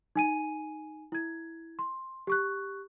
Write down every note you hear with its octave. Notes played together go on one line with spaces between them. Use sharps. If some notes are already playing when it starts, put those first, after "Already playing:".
D#4 G#5 D#7
E4 G#6
C6
G4 C#6 F#6